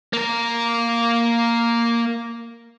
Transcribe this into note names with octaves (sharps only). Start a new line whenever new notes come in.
A#3 A#4